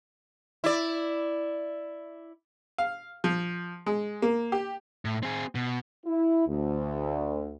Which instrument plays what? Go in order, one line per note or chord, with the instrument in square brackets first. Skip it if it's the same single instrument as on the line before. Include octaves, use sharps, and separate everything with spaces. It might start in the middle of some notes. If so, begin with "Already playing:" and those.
[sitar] E4 D5
[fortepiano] F5
F3
G#3
A#3
G4
[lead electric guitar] A2
C4 G#4
B2
[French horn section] E4
D2